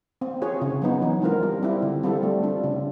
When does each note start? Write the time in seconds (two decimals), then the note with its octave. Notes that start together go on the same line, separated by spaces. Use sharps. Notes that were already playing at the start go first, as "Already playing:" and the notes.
0.21 C4
0.42 F4 G#4 C#5
0.61 C#3
0.82 F#3 B3 D#4
1.02 E3
1.22 G#3 C4 F4 A#4
1.43 G3
1.63 C4 E4
1.82 D3
2.03 G3 C4 F4 A4
2.23 A3
2.43 D4 F4
2.64 C#3